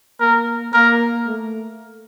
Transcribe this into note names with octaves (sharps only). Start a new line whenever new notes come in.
A#3 A#4
A#3 A#4
A3